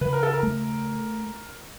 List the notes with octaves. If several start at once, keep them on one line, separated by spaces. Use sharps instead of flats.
C#3 B4
A#4
A4
A#4
A3